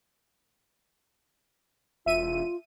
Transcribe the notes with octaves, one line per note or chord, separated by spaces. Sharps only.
E1 F4 E5 D#7